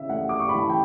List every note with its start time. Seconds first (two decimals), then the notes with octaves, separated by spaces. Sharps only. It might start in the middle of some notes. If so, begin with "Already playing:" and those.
Already playing: C#3 E3 E5
0.09 A3 F#5
0.29 D6
0.39 C#6
0.49 B5
0.54 E3
0.59 A5
0.70 G5